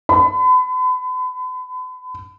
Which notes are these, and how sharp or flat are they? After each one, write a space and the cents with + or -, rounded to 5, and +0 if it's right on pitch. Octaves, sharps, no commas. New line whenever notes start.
B5 +35